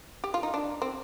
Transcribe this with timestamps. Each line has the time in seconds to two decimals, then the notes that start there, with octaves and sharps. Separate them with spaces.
0.24 G4
0.34 F4
0.43 D#4
0.54 D4
0.82 C4